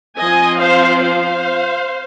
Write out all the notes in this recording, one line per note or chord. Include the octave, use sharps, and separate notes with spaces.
F3 C4 D#5 G#5
C5 F5
C5 F5